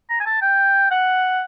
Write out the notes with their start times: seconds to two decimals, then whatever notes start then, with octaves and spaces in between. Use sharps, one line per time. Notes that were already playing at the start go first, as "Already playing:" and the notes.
0.10 A#5
0.21 G#5
0.26 A5
0.42 G5
0.91 F#5